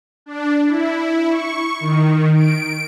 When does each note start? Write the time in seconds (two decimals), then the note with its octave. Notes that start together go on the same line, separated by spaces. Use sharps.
0.26 D4
0.68 E4
1.29 C#6
1.80 D#3
2.35 D7